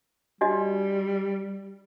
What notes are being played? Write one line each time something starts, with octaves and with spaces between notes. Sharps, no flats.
G3 D4 F#4 D#5